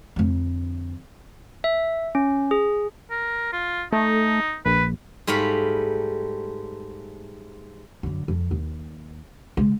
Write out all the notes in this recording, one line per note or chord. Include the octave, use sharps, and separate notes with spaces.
F2 D3
E5
C#4
G#4
A#4
F4
A3 D#4
A#1 B4
G#2 G3 A3 F5 B5
F#2 D3
F2
D#2
C#3 G#3